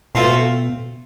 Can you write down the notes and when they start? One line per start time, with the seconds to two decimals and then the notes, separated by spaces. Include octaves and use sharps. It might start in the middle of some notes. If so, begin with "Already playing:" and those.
0.15 B2 A3 C4 F4